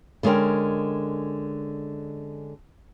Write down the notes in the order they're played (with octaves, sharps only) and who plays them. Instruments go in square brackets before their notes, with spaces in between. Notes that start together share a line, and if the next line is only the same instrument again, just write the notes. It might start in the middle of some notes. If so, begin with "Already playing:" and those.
[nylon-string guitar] D3 G#3 C#4 A#4 G5